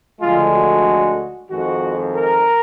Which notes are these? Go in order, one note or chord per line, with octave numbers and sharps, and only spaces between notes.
D2 D3 F3 G#3 F4
F#4
F2 D#3 G#3 F#4
A#4